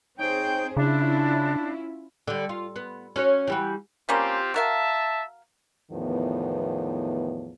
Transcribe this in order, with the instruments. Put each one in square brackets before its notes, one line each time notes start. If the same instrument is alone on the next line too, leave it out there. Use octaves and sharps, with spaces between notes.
[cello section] C4 G#4 C5 [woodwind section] D#4 C#5 G5
[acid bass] C#3 [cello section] C#4 E4 F4 [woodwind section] D4
[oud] D3 G3
F4
B3
C#4 F#4 C#5
E3 G3 F#4
[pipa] G3 A#3 C#4 [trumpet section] C4 F4 G4
[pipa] F#4 A#4 F5 [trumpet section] E5 A5
[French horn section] E2 A2 D#3 F3 B3